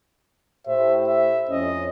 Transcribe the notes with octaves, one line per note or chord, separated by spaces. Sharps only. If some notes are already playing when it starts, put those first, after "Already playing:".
A2 G4 C5 E5
E5
F2 C#4 D#5